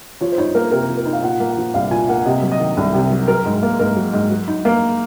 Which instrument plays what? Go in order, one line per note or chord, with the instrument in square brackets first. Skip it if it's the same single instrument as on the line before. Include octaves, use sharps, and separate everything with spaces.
[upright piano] F3 C#5
C5
D#4 C#5
A#3 A#4
C3 A#4
F3
A#4
D#4
F5
A#2 F#5
A#3
F#5
F3
C2 F5
A#2 G#5
A#3 F#5
C3 D#5
F#3
D#5
D#3
C2
C3
F#3
F#3 A#4
G#2
A#3
G#2 A#4
F#3
G#2
F#3
D#4
A#3